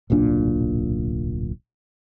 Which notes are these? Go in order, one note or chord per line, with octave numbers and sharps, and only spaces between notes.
D1 B1 A#2 D4